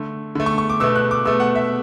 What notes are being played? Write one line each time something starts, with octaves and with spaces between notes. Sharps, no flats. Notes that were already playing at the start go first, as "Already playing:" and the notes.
Already playing: D3 A3
D3 A3
C#6
C#6
D6
B2 A3 E6
F#6
D6
B2 A3 E6
F#5
E5